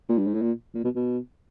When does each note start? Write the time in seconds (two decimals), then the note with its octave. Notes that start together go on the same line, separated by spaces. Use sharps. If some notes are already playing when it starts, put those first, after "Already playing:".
0.09 A#2
0.18 G2
0.27 G#2
0.34 A2
0.42 A#2
0.74 A#2
0.84 B2
0.96 B2